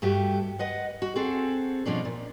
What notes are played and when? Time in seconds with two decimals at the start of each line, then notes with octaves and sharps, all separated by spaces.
0.02 G2 A3 F#4 G4
0.59 B4 D#5 F#5
1.02 F#4
1.16 C4 F#4 G#4 A4
1.86 B2 F3 C#4 D4
2.05 A#2